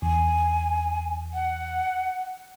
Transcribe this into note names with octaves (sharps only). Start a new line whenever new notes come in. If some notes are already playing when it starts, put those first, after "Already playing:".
E2 G#5
F#5